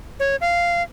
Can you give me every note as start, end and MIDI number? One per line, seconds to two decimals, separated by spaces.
0.20 0.36 73
0.41 0.82 77